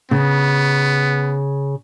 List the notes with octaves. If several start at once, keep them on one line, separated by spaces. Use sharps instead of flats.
C#3 B3